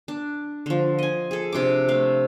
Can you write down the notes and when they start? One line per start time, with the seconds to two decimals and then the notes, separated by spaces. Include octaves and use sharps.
0.08 D4
0.66 D3 F3
0.99 D#5 G#5
1.31 G#4 A4
1.53 C3 D4 C5 D6
1.88 A3 F5